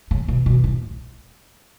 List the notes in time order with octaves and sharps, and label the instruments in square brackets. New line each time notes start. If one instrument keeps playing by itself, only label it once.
[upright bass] C#3
B2
B2
A2